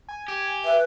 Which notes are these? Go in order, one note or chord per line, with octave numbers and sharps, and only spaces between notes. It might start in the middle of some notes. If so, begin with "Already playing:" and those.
G#5
G4
B4 E5